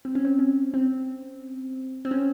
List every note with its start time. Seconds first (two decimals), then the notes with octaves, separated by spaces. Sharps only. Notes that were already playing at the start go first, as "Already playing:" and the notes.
0.05 C4
0.15 C#4
0.25 C4
0.39 C#4
0.74 C4
2.05 C4
2.11 C#4